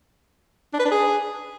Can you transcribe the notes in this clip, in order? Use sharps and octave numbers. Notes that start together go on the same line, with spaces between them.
D4
B4
D4
G#4